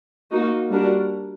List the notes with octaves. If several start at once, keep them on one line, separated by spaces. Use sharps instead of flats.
A#3 D#4 F#4
G3 D4 F#4 A#4